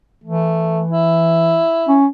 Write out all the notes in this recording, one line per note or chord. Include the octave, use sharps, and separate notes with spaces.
E3 A3
E4
C#4